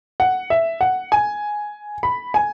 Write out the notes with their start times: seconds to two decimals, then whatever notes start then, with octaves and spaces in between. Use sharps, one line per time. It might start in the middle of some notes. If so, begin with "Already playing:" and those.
0.20 F#5
0.50 E5
0.81 F#5
1.12 G#5
2.03 B5
2.34 G#5